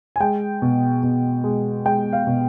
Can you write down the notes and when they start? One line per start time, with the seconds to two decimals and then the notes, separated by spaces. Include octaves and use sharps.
0.16 G#5
0.20 G#3 G5
0.62 B2
1.03 B2
1.44 G#3
1.85 G#3 G5
2.13 F5
2.27 B2